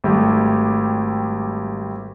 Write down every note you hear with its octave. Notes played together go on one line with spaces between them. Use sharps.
G#1 G3 A3 G4